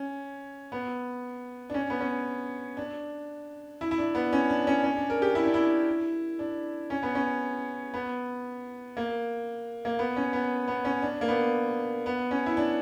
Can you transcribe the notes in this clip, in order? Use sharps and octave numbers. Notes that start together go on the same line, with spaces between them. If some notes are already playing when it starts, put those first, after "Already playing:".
Already playing: C#4
B3
D4
C#4
B3
C#4
D4
E4
E4
D4
B3
C#4
D4
C#4
C#4
D4
A#4
G4
E4
D4
E4
D4
C#4
B3
C#4
B3
A#3
A#3
B3
C#4
B3
B3
C#4
D4
A#3
B3
B3
C#4
E4
D4